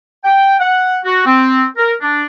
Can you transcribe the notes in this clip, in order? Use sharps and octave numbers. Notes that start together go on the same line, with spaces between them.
G5
F#5
F#4
C4
A#4
D4